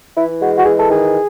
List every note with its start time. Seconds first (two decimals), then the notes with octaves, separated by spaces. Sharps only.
0.17 E3 E4
0.41 G#3 F#4
0.58 F#4
0.66 E3 G#4
0.79 A4
0.89 D#3 G#4